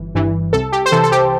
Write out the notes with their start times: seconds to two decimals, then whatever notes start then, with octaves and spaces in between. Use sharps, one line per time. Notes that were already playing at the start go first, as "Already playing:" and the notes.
Already playing: G1 E3
0.15 G2 E3
0.53 C2 A4
0.72 G4
0.86 C5
0.92 C3 E3 A4
1.03 A4
1.12 G4